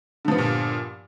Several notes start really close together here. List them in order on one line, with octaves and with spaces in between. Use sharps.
D3 F3 B3 G2 A#2